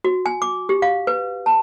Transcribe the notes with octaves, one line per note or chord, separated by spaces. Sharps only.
F#4
G#5
D6
G4
F5
B4
A5